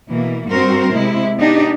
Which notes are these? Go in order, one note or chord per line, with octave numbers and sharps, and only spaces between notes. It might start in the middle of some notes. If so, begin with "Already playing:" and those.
B2 E3 A#3
G2 C4 F#4 A#4 C5
C3 G#3 E4
B3 D4 D#4 G4